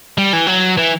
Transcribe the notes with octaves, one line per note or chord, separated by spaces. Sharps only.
G3
E3
F#3
E3